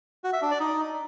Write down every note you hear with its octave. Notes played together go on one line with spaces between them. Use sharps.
F#4
E5
D4
D5
D#4